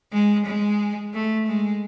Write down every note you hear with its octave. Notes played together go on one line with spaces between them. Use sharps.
G#3
G#3
A3
G#3